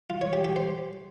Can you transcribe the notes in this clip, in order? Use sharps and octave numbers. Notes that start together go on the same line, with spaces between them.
F4
C#5
G4
G4
C5